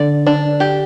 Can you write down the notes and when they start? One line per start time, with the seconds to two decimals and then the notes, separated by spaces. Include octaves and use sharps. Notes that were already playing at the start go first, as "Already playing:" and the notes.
Already playing: D3 D5
0.27 D4
0.60 G4